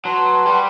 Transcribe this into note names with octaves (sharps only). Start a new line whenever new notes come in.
F#3 B4 F#5 A5 C6
G3